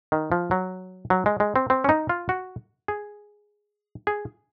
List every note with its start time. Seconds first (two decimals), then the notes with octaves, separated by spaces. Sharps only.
0.12 D#3
0.32 F3
0.51 F#3
1.10 F#3
1.26 G#3
1.40 G#3
1.56 C4
1.70 C4
1.84 C#4
1.89 D#4
2.09 F4
2.29 F#4
2.88 G#4
4.07 G#4